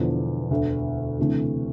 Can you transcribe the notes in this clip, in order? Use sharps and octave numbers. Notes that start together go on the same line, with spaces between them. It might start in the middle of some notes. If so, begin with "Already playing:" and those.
Already playing: E1 E2 D3 F3
E1 D2 D3
D2 C3 E3 A3